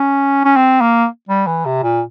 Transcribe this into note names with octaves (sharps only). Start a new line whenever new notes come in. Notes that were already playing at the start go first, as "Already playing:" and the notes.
Already playing: C#4
C#4
C4
A#3
G3
E3
C3
A#2